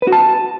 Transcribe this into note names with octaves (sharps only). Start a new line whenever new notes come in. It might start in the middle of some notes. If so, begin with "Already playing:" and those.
B4
F#4
A5